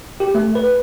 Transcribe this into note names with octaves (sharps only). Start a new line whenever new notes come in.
G4
A3
B4